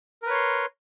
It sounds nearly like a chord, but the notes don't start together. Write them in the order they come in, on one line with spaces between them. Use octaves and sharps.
A#4 B4 C#5 C6